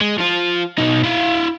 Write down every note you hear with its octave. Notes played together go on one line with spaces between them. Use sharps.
G#3
F3 F4
B2 D#4
E4 F5